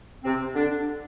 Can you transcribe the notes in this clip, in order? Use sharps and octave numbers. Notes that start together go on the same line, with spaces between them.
C3 C4
D3 D4